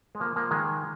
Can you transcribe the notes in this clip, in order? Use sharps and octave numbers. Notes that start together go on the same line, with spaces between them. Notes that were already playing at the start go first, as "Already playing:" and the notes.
G#3
F3 A#3
F3 A#3
D#3 G#3